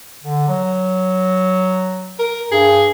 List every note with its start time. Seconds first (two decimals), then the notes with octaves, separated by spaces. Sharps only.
0.23 D3
0.48 F#3
2.19 A#4
2.52 G2 G#4